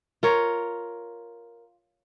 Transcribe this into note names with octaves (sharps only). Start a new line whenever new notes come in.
F4 A#4 C#5